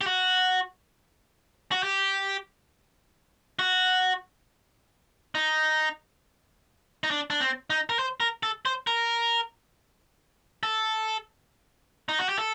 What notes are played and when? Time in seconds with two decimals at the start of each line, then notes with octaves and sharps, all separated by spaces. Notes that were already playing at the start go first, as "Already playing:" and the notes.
0.01 G4
0.06 F#4
1.72 F#4
1.83 G4
3.59 F#4
5.35 D#4
7.04 D#4
7.11 D4
7.30 D4
7.41 C4
7.70 D#4
7.90 A#4
7.99 C5
8.20 A#4
8.43 A4
8.66 C5
8.87 A#4
10.63 A4
12.09 D#4
12.19 F#4
12.29 G4
12.38 A4